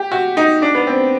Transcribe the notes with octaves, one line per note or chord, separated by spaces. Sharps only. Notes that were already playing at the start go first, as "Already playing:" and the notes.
Already playing: G4
F#4
D#4
D4
B3
C4